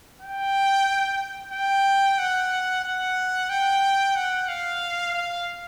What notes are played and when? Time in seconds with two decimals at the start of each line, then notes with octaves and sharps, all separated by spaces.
0.21 G5
1.52 G5
2.18 F#5
2.84 F#5
3.50 G5
4.16 F#5
4.48 F5
5.14 F5